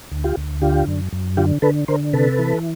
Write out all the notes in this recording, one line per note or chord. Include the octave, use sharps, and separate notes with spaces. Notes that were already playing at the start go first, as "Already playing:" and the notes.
D2
F4 G4
D2
D3 F4 G4
F#2
F#2
D3 F4 G4
D3 A4 B4
D3 A#4 C5
C3 A4 B4
E3